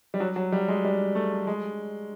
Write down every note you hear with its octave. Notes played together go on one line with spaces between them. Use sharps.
G3
F#3
F#3
G3
G#3
G3
A3
G#3